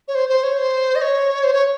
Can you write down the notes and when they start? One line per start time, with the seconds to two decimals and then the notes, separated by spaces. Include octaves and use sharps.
0.08 C#5
0.15 C5
0.29 C5
0.43 C#5
0.58 C5
0.95 D#5
1.01 C#5
1.44 C5
1.53 C#5